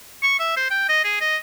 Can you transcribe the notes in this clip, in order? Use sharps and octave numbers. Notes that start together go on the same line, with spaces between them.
C#6
E5
C5
G5
D#5
G#4
D#5